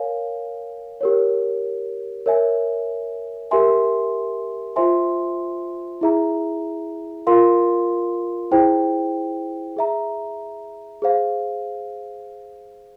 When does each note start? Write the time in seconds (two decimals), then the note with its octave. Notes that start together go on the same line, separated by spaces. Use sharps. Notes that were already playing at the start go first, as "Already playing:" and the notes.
Already playing: A#4 C#5 F5 G#5
1.01 G4 A#4 C#5
2.26 A#4 C#5 E5 G#5
3.51 G4 A#4 E5 G#5 C6
4.76 F4 C5 E5 G#5 C6
6.01 E4 G#4 E5 A#5
7.27 F4 A#4 F5 C6
8.51 E4 G#4 C5 G5
9.77 G#4 E5 A#5
11.02 G#4 C5 F5